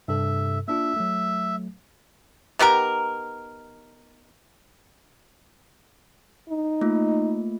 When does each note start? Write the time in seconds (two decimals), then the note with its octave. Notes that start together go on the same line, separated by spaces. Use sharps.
0.08 G2 C3 A4 E5
0.68 A#3 D4 F4 E5
0.97 F#3 A3
2.59 D#3 B3 G4 A#4
6.49 D#4
6.81 A3 A#3 F4